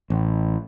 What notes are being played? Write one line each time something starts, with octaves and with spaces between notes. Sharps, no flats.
A1